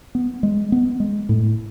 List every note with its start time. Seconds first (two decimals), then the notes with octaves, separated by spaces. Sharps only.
0.15 B3
0.43 G#3
0.72 B3
1.00 G#3
1.29 A2